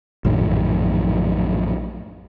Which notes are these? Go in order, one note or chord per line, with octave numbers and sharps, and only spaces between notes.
A#1 F#2 A2 D#3